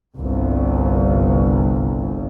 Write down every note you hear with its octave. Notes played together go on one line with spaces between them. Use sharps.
G1 C2